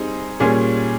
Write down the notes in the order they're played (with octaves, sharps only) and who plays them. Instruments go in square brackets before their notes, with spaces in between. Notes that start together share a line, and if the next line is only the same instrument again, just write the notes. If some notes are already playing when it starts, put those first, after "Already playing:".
Already playing: [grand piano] G3 C4 D#4 G#4
A#2 G3 C#4 G#4